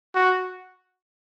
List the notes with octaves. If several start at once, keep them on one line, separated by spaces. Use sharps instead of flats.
F#4